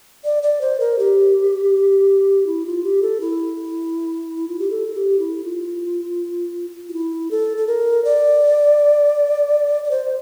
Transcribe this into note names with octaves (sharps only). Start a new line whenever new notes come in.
D5
D5
C5
A#4
G4
E4
F4
G4
A4
E4
F4
G4
A4
G4
E4
F4
F4
E4
A4
A4
A#4
D5
D5
C5